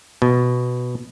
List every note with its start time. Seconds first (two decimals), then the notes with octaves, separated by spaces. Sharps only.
0.22 B2